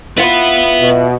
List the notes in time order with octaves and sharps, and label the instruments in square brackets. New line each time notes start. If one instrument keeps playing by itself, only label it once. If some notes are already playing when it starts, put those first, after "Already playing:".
[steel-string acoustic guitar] E4 F4 [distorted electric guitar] B4 F#5
[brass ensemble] B2